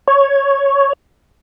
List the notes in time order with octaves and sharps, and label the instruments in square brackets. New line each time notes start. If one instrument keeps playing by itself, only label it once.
[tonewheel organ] C#5